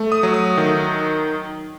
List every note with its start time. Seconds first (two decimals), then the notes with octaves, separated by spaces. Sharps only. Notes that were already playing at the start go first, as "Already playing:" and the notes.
Already playing: A3
0.12 D#6
0.23 F#3
0.34 D#6
0.57 D#3